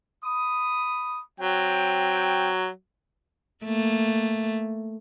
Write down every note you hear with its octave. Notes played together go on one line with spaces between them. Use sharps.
B5 D#6
F#3 C4 G5
A3 A#3